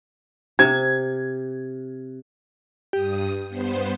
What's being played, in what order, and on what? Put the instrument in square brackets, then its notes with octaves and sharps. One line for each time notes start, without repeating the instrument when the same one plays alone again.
[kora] C3 [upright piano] G#6
[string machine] G2 D#6 [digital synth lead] G4
[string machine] G2 B3 C5